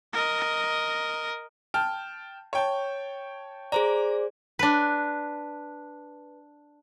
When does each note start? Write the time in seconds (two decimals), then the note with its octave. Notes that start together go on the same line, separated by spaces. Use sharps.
0.13 A#4 D#5
1.74 G5 A5 F6
2.53 C#5 G5 A5
3.72 G#4 C5 D5 A#5
4.59 D4 B4